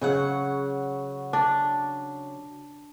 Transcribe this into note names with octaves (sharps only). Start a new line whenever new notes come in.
C#3 F#3 F#5
D4